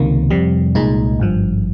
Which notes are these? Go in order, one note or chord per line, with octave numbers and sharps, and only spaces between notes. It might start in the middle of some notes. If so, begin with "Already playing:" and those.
Already playing: C#2 C3 D#3 A#3
F2 C3 G3
C2 A#2 G#3 D#4
G#1 G2 F3